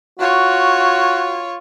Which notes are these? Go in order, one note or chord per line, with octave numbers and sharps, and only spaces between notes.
F4 F#4 C#5